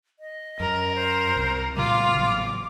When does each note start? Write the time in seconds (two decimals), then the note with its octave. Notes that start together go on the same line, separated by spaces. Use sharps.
0.19 D#5
0.60 F#2 A#4
0.95 C5
1.36 C2
1.76 A#2 C#3 G3 F4 D6
2.15 A1 F#3